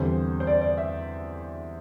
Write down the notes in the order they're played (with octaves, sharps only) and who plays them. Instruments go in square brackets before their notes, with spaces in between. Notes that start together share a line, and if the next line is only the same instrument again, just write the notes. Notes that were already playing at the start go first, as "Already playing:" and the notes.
Already playing: [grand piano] E2 D3 G3 C4 C5
C5
D5
D5
E5